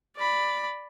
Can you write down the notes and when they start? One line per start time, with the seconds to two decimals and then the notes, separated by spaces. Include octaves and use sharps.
0.17 D5 B5